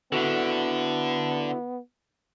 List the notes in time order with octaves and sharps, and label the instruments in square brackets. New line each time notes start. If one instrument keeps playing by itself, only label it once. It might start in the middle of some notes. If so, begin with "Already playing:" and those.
[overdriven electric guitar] D3 [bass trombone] B3 [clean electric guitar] E4 F#4 A4